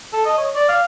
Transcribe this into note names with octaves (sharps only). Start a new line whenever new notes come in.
A4
D#5
C#5
D5
F5